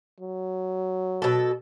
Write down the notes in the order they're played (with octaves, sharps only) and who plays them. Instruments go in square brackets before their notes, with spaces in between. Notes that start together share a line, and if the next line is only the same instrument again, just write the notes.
[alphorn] F#3
[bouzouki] B2 A4